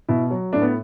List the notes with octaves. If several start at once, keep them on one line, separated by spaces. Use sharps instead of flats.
B2 E4
F#3
A2 D4
B3